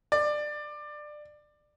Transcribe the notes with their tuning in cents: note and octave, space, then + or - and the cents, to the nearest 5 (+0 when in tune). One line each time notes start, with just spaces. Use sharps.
D5 +20